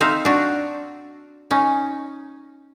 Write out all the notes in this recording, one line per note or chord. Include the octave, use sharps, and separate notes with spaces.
C4 D#4 E5 F5
D4 F#4
C#4 D#4